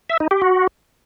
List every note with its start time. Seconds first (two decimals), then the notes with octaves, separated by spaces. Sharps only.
0.10 E5
0.20 D#4
0.31 G4
0.42 F#4